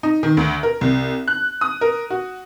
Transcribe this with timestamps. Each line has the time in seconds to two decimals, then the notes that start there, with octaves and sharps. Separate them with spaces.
0.03 D#4
0.23 D#3
0.37 D2
0.63 A#4
0.81 C2
1.28 F#6
1.61 D#6
1.81 A#4
2.10 F#4